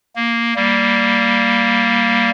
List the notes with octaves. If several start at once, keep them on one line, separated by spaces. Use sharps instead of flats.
A#3
G3 A#3